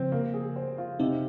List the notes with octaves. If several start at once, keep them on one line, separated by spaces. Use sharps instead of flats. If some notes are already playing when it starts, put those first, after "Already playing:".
Already playing: C#3 F3 C4
A#3
G#4
C5
F4
C3 C4 D#4